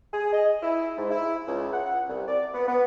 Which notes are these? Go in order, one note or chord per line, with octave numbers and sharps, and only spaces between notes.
G#4
D#5
E4
G#2
E4
C#2
F#5
C2
D5
B3
B3